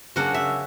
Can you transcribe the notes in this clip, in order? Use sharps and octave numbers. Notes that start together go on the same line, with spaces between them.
C#3 F#3 A#3 D4 F#5
E5